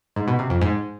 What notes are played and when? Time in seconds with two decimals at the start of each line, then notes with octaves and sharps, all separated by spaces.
0.16 G#2
0.28 B2
0.39 C3
0.50 F2
0.61 G#2